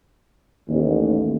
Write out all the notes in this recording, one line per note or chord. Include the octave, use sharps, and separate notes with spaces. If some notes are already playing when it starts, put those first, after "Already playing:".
A1 D#2